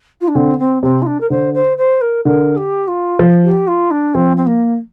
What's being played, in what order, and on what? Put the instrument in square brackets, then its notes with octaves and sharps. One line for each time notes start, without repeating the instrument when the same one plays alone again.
[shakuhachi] F4
D4
[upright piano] D3 [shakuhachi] C4
[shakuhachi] C4
[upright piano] C3 [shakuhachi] C4
[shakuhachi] F4
D4
A#4
[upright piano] D3 [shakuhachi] C5
[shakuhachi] C5
C5
A#4
[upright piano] D3 [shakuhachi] A#4
[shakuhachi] G4
F4
[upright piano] F3
[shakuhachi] G4
F4
D4
[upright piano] F3 [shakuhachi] C4
[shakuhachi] C4
A#3